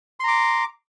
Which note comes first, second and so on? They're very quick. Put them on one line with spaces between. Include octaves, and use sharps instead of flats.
C6 A#5 D6